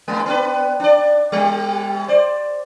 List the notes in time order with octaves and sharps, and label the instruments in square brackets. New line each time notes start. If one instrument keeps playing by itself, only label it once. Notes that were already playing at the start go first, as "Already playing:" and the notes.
[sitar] G#3 A#3
B3 D4 B4
D4 D5
G3 G4
C5 D5